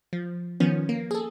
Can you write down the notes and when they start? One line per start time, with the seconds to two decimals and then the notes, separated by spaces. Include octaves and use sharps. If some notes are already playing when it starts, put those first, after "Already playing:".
0.13 F3
0.60 D#3 F3 B3 C#4
0.89 A#3
1.11 G#4 A4